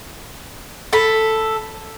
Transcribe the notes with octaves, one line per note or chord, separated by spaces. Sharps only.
A4 B5